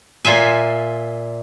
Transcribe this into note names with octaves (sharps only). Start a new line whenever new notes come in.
A#2 F4 E5 G#5